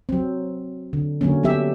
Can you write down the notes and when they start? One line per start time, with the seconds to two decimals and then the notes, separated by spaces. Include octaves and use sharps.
0.09 F#3 C4
0.93 D3
1.21 D3 F#3 A#3 C#4
1.43 F#3 B3 G4 E5